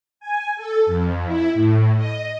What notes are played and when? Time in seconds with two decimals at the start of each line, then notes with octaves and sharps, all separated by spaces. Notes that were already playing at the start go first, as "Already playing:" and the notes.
0.20 G#5
0.56 A4
0.86 F2
1.26 E4
1.54 A2
1.96 D#5